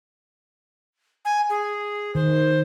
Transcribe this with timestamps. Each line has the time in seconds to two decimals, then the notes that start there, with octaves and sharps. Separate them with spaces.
1.25 G#5
1.50 G#4
2.15 D#3 C5